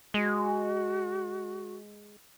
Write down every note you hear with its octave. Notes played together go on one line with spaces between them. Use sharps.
G#3 F#4